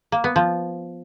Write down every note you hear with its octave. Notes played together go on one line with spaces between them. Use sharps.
A#3
B3
F3